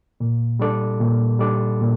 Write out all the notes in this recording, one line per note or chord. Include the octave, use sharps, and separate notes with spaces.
A#2
G3 D4 A4 D5
A#2
G3 D4 A4 D5
A#2